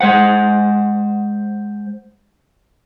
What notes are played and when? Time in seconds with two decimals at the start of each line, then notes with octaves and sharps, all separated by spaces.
0.01 G#3 C5 F#5